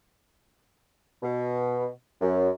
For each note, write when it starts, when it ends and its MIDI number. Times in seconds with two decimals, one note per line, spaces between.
1.23 1.88 47
2.21 2.50 42